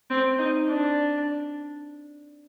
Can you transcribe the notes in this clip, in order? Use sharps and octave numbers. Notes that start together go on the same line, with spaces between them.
C4
D#4
D4